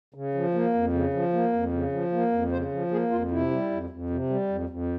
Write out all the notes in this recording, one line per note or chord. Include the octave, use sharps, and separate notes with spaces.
C#3
F3
A#3
F2
C#3
F3
A#3
F2
C#3
F3
A#3
F2
C#3 C5
F3
A#3 G#4
F2 F4
C3 E4
G3
F2
F2
C3
G3
F2
F2